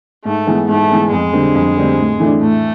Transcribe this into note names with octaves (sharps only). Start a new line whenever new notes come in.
G#2 A3
E3 G#3 B3
G#2 A3
E3 G#3 B3
F2 G#3
D3 G3 C4
F2
D3 G3 C4
A2
E3 A3 D4
A2 A3